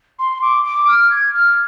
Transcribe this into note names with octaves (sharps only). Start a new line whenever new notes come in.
C6
D6
D6
F6
G#6
F6